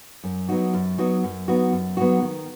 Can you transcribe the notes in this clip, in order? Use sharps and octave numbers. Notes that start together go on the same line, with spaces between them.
F#2
F#3 B3 D#4 F#4
F#2
F#3 B3 D#4 F#4
F#2
F#3 B3 D#4 F#4
F#2
F#3 B3 D#4 F#4
D#3